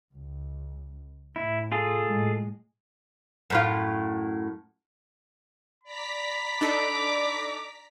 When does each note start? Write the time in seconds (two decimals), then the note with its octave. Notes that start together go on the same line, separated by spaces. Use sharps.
0.13 C#2
1.36 A2 E4
1.72 F4 G#4 A4
2.06 A2 G#3
3.50 F#2 A2 F4
5.83 D5 A#5 B5 B6
6.61 D4 D#4 A4 D6